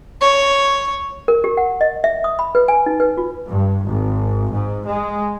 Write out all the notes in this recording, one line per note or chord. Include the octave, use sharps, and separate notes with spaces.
C#5
A#4
G4
F#5
D#5
E5
D#6
B5
B4
G#5
D#4
B4
F4
G2
G#1
G#2
G#3